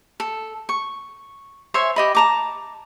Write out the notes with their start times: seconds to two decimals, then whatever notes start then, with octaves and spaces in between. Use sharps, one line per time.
0.20 A4
0.69 C#6
1.74 C5 C#5 E5 G#5
1.96 G4 D#5 B5
2.15 A5 A#5 D6